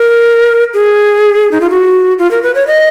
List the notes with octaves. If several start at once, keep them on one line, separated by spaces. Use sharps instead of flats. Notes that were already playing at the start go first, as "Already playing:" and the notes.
Already playing: A#4
G#4
D#4
F4
F#4
F4
A#4
B4
C#5
D#5